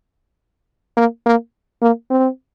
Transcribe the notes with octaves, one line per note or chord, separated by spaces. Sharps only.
A#3
A#3
A#3
C4